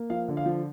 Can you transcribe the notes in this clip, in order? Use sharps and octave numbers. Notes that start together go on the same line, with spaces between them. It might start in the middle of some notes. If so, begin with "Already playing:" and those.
Already playing: A#3
F3 F5
D3
F5
F3